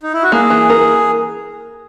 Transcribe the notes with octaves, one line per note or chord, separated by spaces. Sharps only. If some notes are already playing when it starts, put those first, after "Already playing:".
D#4
E4
F#4
A#3 G#4
E3
A#4